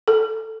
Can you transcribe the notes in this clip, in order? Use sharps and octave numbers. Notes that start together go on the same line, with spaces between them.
A4